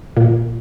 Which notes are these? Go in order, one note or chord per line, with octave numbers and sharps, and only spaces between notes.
A#2